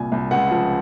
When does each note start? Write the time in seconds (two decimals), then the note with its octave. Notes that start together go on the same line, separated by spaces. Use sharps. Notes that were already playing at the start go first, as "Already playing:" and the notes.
Already playing: C2 A#2 G#5
0.12 C2
0.31 C#2 F#5
0.51 F3